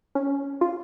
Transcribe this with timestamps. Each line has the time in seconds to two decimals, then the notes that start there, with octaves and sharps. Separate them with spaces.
0.15 C#4
0.61 F4